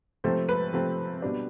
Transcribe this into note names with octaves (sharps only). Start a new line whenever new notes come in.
C3 F3 A3 C4 C5
B4
C3 F3 A3 C4
B2 G3 D4